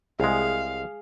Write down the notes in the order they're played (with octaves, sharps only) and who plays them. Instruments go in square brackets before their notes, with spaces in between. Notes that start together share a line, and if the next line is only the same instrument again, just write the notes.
[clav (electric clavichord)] C2 G#3 [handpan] G#4 [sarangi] F5